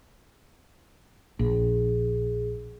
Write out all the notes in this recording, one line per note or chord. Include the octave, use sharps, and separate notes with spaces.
A#1 G#4